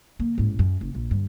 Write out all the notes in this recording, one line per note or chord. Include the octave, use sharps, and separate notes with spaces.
D3 A#3
A1 G#2
F#2
F#1
A#1
G2 D3